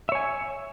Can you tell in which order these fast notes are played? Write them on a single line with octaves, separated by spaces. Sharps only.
E5 C#5 G#5